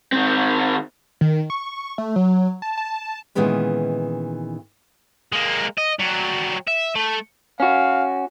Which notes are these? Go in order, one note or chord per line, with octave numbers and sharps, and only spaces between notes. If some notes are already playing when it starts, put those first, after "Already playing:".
D#3 C4
D#3
C#6
A3
F#3
A5
A5
A#2 D#3 E3 G#3 B3 C#4
G#3 A#3
D#5
F#3 G3
E5
A3
C#4 F#4 F5